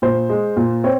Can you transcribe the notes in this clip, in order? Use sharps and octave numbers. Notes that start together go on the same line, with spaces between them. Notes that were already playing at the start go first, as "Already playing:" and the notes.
A#2 C5
G#3
A#2
C4 C#5